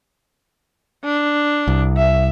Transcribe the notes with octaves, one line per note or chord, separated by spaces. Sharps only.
D4
C2
E5